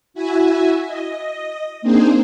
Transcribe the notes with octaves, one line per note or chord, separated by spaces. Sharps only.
E4 F#4 E5 G#5
D#5
A#3 C4 D4 D#4 G#4 C5